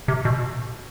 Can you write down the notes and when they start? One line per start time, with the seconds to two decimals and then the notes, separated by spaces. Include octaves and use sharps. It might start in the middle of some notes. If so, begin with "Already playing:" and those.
0.08 C3
0.25 B2